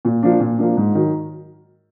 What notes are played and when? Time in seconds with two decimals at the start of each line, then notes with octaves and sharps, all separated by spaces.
0.05 A#2
0.23 F3 A#3 D4
0.40 A#2
0.59 F3 A#3 D4
0.77 G#2
0.95 D#3 F#3